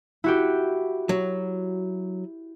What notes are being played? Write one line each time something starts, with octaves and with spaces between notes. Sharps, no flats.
E4 F#4 G4
F#3